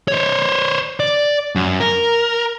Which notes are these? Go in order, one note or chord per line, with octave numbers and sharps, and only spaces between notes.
C5 C#5
D5
F#2
A#4